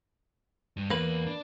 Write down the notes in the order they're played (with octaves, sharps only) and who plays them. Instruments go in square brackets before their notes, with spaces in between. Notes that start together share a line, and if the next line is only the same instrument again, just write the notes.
[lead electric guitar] G2
[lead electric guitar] E2 [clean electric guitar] A#3 B4
[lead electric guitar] D4